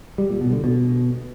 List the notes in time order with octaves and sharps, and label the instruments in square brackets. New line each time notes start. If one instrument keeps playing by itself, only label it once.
[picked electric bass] G3
A#2
B2
D3
B2